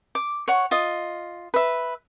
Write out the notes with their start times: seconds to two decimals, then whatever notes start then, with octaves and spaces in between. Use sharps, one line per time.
0.15 D6
0.48 C#5 F#5 C#6
0.71 F4 D#5
1.54 B4 E5